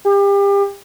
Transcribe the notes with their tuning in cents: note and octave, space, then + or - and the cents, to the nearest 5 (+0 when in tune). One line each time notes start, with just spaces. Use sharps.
G4 +35